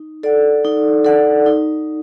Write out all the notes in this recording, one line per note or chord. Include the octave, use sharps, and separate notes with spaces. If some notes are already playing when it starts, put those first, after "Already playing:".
Already playing: D#4
A4 D5 F#5
D#4
A4 D5 F#5
D#4